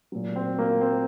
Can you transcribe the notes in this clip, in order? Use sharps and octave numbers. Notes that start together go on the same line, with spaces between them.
A#2 F#3
C4
A#3
C4